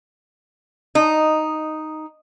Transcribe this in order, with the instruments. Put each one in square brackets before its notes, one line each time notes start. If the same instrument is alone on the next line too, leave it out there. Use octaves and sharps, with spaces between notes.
[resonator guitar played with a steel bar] D#4